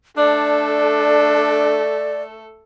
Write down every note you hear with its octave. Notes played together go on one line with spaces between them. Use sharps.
A3 D4 A4 D5